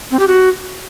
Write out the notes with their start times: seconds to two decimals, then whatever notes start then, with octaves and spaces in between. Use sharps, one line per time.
0.11 C4
0.19 G4
0.28 F#4